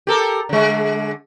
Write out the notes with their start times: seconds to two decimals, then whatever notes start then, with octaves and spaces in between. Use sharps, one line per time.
0.07 G4 A4 A#4
0.49 D3 G#3